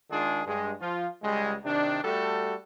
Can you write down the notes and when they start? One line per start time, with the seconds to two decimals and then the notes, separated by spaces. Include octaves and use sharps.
0.10 D#3 G#3 D4 F4 G#4
0.45 G2 G#3
0.81 F3 F4
1.22 C#2 G3 G#3
1.64 C3 D#3 D4
2.03 G3 A3 F#4 A4